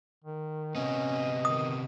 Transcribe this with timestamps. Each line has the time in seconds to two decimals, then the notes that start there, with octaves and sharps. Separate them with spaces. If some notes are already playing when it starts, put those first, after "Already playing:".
0.24 D#3
0.75 C3 B3 C#4 D#5
1.45 D#3 D#6